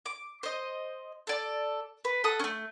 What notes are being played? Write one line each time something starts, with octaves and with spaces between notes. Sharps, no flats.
D6
C5 D#5
A4 D5
B4
A4 F#5 D#6
A3 C#4